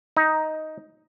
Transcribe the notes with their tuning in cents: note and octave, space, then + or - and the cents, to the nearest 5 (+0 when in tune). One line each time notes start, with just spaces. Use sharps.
D#4 +10